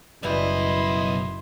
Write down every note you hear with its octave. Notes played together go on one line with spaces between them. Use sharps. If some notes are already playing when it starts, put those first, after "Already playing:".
F#1 B1 E3 G3 E4 D#5 C6